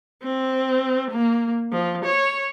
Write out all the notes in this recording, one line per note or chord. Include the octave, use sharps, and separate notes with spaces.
C4
A#3
F3
C#5